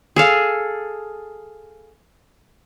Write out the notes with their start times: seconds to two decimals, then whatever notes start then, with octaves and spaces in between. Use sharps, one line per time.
0.16 G#4 A4 F5